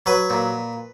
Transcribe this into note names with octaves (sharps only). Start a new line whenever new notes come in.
F#3 B4
A#2